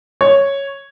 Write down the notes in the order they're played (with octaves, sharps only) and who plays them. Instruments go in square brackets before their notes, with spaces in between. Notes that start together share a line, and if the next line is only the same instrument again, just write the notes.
[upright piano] C#5